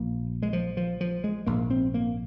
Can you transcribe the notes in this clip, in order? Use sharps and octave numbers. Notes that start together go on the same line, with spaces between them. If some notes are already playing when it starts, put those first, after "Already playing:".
Already playing: A#1 A#2 A#3
G#3
F3
F3
F3
G#3
A#1 G#2 A#3
C4
A#3